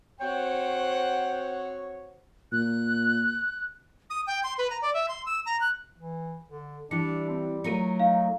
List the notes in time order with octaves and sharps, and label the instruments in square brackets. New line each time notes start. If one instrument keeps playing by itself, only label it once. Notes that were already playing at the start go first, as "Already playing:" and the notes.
[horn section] C4 F#4 C#5 [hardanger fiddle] C5 F#5 [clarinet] G5
[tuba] A#2 [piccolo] F#6
[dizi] D#6
G5
C6
B4
A#5
D5
E5
C6
E6
A#5
F#6
[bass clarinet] E3
D3
[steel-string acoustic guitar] E3 [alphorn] G3 [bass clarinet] D4 [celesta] C#7
[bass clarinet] C4
[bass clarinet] F#3 [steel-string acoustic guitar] A3 F4 A#4 [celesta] C#7 D#7
[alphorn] D#4 [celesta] F5